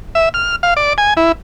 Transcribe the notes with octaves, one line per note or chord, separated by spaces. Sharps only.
E5
F6
F5
D5
G#5
E4